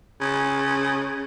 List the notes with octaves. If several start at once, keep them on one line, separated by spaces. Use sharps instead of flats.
C#3